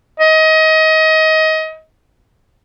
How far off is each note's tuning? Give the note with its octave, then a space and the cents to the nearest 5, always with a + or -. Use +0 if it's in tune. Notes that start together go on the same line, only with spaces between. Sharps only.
D#5 +25